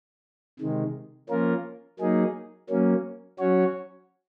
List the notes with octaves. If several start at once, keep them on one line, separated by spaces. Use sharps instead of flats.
C3 D#3 G#3
F3 A#3 C#4 F4 A#4
F#3 A#3 D#4 G#4
F#3 A#3 C#4
F#3 C#4 F#4 C#5